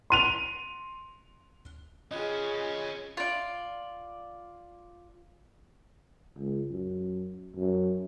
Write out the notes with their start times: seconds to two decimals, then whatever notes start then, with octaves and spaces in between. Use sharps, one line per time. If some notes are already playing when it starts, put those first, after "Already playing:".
0.10 C6 D#7 F7
2.11 C#4 F4 G#4 B4 D#5
3.17 F4 D5
6.38 C#2
6.71 F#2
7.56 F#2